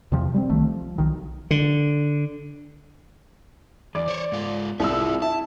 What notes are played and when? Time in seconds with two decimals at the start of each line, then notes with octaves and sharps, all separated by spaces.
0.12 E2 C3 F3
0.34 G3 A3 C4
0.49 C2 D#3 A3
0.63 F3
0.98 B1 D#3
1.51 D3
3.95 E2 D5
4.08 C5 C#5
4.32 G#2 F4
4.80 C2 F4 G#4 E5 E6
5.22 E4 A5